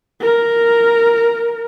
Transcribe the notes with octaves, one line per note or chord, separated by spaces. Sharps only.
A#4